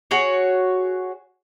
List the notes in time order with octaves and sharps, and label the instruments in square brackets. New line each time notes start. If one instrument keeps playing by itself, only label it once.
[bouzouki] F#4 G#4 C#5